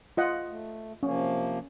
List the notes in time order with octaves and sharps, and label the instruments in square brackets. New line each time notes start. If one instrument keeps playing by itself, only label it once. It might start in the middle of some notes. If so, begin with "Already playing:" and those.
[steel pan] F4 D#5 F#5
[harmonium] A3
[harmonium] C3 F3 A#3 [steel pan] C#4